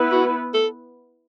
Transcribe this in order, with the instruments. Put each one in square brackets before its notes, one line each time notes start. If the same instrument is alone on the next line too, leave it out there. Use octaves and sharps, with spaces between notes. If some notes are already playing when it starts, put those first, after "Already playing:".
Already playing: [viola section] B3 E4 B4
[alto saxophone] F#4
A4